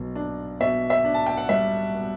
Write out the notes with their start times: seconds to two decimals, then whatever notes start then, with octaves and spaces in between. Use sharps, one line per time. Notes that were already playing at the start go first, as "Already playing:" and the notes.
Already playing: B1 B2
0.15 D4
0.60 B2 E5
0.90 E5
1.05 D4
1.14 A5
1.26 G5
1.37 F#5
1.49 G3 E5
1.94 B2